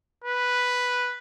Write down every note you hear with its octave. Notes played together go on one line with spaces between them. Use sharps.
B4